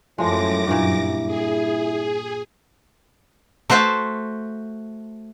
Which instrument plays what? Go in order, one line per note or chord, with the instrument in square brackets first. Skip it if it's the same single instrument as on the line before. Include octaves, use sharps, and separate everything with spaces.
[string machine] F#2 D6 A#6 [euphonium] A2 [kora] F3 G#3
[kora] G2 A#2 [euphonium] E4
[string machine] G#4
[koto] A3 F#4 C5 E5 A5